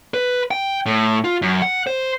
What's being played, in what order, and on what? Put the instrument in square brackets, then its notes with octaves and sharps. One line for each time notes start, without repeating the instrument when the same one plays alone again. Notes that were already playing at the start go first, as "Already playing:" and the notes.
[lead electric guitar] B4
G5
A2
F4
F#2
F#5
C5